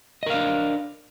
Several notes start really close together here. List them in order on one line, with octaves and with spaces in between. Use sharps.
D#5 A#4 F5 D4